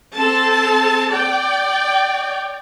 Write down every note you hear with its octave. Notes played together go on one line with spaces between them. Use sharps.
C4 A4 A5
D5 G5